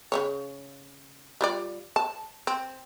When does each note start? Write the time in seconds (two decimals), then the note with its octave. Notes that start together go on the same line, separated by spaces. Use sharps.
0.12 C#3 B3 C#5
1.41 G3 F4 D5
1.96 A5
2.47 C4